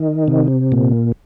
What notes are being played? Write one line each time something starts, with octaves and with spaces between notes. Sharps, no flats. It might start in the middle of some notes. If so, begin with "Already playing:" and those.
Already playing: D#3
C3
A#2